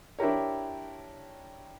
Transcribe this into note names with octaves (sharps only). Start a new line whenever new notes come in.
D4 E4 G4 A#4 C#5